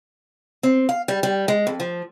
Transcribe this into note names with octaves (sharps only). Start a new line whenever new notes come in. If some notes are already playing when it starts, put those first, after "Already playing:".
C4
F5
G3
G3
G#3
F2
F3